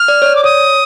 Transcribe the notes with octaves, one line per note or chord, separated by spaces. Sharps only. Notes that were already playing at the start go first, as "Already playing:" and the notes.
Already playing: F6
D5
C#5
D5
D6
C#5 D#6